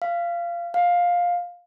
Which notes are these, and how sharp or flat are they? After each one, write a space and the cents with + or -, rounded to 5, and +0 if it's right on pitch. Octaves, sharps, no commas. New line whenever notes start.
F5 -20
F5 +15